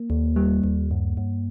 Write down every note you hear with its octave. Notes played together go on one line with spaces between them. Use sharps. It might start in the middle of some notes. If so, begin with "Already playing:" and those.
Already playing: A#3
D#2
G3
D#2
G2
G2